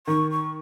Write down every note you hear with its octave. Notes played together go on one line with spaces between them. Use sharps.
D#3 C#6
C#6